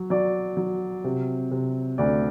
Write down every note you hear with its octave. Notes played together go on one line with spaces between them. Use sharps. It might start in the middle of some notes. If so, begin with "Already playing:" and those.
Already playing: F#3
F#3 D5
F#3
C3
C3
D2 D5